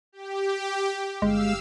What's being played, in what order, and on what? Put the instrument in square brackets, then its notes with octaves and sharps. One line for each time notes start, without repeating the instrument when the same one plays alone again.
[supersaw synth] G4
[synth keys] G1 [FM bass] G#3 [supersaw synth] F5 E6